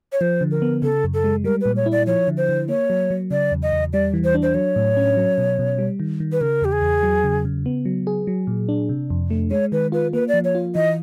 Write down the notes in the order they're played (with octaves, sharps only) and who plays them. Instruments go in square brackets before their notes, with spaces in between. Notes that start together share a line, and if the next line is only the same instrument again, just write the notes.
[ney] C#5
[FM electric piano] F3 [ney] C5
[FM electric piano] D3
[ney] A#4
[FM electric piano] B3
[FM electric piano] C#3 [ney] A4
[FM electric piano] F#2
[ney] A4
[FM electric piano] G#3
[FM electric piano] G3 [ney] A#4
[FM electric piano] A#2 [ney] B4
[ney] C#5
[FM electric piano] E4
[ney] D5
[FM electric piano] F3 [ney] C#5
[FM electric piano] D3
[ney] C5
[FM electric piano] D3
[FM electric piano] A#3 [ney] C#5
[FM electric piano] F#3
F#3
[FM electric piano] C#3 [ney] D5
[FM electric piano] E2
[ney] D#5
[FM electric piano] E2
[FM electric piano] G3 [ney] D5
[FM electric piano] E3
[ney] C5
[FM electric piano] D4
[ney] C5
[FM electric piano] F#3 [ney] C#5
[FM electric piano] A2
C#4
F#3
B2
B2
G3
D#3
D#3
[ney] B4
[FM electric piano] C#3 [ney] A#4
[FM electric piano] E2 [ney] G4
[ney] G#4
[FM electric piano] E2
F#3
C#3
C#3
B3
F#3
G#4
F#3
A#2
D4
C3
F2
A3
[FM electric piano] G#3 [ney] C#5
[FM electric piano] D#3 [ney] B4
[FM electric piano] F4 [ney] B4
[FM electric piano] A#3 [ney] B4
[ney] D5
[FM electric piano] F3
[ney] C#5
[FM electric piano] F4
[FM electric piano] E3 [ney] D#5